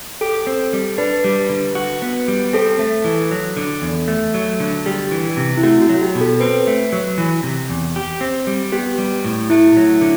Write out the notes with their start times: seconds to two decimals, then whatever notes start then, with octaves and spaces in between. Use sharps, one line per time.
0.21 G4 A4
0.47 C4
0.73 G3
0.98 D4 B4
1.24 G3
1.50 D3
1.75 F#4
2.02 B3
2.28 G3
2.53 C4 A4
2.79 A3
3.04 E3
3.31 F#3
3.57 D3
3.82 E2
4.08 A3
4.34 F#3
4.60 D3
4.86 G3 G4
5.11 E3
5.37 C3
5.57 E4
5.63 A3 F#4
5.82 F#4
5.89 F#3
6.02 G4
6.15 B2
6.21 A4
6.40 C4 B4
6.67 A3
6.93 F#3
7.18 E3
7.43 C3
7.69 E2
7.96 G4
8.21 C4
8.47 G3
8.72 B3 G4
8.98 G3
9.24 A2
9.50 A3 E4
9.77 F#3
10.01 D3